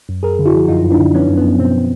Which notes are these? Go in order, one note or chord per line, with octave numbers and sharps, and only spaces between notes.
F#2
F#2 G#4 A#4
D3
E4 F#4
F3
F#2 D#4 F4
F#2
D4 E4
D3
F3 B3 C#4
F#2
B3
F#2
B2 C4